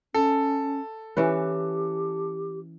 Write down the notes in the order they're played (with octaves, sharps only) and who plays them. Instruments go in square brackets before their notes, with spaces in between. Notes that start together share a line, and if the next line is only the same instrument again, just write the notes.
[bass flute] C#4 [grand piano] A4
[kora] E3 C#4 B4 [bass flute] G4